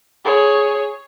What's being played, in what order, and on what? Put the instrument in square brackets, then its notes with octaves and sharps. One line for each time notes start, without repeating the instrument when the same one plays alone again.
[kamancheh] G#4 C#5